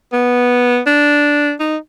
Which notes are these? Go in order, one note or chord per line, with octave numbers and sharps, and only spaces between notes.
B3
D4
D#4